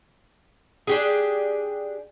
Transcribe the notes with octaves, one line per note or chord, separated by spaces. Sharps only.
D4 G4 G#4